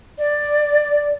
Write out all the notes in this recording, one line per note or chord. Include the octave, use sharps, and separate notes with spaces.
D5